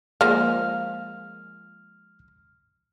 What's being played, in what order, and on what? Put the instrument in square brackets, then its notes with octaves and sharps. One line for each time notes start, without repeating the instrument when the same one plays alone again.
[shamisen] F3 G#3 A#3 [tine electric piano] F6